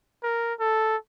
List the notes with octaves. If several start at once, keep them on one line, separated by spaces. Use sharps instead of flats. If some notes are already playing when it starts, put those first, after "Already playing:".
A#4
A4